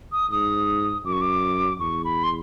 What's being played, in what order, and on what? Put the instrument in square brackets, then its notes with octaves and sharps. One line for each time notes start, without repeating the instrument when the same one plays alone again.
[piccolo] D#6
[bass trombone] G#2 [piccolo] D#6
[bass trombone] F#2 [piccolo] D6
[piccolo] C#6
D6
[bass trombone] E2 [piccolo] C#6
[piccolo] B5
C6